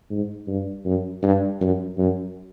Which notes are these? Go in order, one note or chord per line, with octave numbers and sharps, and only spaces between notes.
G#2
G2
F#2
G2
F#2
F#2